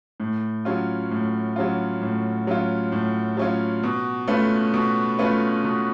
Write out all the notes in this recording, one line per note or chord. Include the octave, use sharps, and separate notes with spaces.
A2
F#3 C#4 F4
A2
F#3 C#4 F4
A2
F#3 C#4 F4
A2
F#3 C#4 F4
B2
A3 C#4 F4 B4
B2
A3 C#4 F4 B4
B2